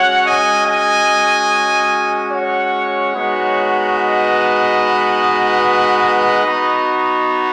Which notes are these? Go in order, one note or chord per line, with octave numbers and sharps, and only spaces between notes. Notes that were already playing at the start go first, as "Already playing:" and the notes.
Already playing: G#3 C#4 F#4 C#5 F#5
D#5 G#5
D#5 G#5
C#5 F#5
G#3 B3 D#4 F#4
B4 D#5
B3 D#4 F#4